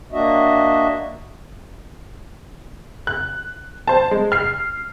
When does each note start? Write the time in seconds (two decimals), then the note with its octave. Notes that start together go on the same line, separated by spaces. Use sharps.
0.12 A#3 D4 F#4 D#5 E5
3.07 F#6
3.87 C5 A5
4.11 G#3
4.32 F6 C7